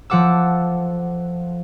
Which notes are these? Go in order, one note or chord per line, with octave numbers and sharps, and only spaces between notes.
F3 A4 F#5 D6 E6